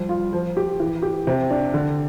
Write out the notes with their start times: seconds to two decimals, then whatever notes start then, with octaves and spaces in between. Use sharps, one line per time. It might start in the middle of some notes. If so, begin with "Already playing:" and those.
Already playing: F3 G3
0.09 F4
0.33 F3
0.57 G4
0.80 E3
1.02 G4
1.27 C3
1.50 D4
1.74 D3